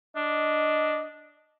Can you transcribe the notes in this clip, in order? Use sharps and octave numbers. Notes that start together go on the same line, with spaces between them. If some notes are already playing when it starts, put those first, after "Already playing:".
D4 D#5